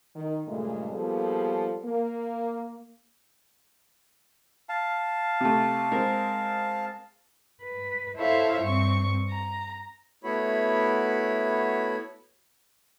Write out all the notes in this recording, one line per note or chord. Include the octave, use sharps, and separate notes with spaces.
D#3
G2 A#2 C#3 G#3 A3
F3 G3 A#3 B3 G#4 A4
A#3
F5 A5
C3 A3
G#3 C4 A#4
B4
E4 A4 C5 C#5 E5 F5
G2 C4 C#6
A#5
A3 B3 E4 F#4 C#5 B5